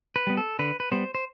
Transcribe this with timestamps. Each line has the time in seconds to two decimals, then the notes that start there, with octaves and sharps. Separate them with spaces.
0.16 B4
0.27 G3 B3
0.37 A4
0.59 D3 B4
0.80 B4
0.92 G3 B3 C5
1.15 C5